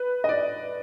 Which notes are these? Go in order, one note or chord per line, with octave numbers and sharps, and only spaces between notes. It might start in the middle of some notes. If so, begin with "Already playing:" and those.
Already playing: B4
D#5
D5